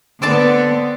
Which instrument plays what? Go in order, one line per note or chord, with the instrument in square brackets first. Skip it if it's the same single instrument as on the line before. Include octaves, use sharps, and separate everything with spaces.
[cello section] D3 B3 [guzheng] C4 D5 A5